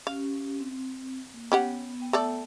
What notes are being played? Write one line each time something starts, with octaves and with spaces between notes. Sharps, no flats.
C#4 G4 F5
C4
A#3
B3 C#4 G4 F#5
B3 G5
A3 A4 D5